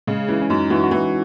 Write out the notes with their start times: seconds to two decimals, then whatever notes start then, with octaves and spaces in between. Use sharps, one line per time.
0.07 C#3 G#3
0.28 E3 C#4
0.42 C#4
0.50 F#2 D#4
0.70 E3 F#4
0.84 F#4
0.91 E3 E4